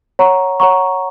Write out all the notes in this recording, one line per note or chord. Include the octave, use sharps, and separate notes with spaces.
C#5 F#5 A#5 C#6
C#5 F#5 A#5 C#6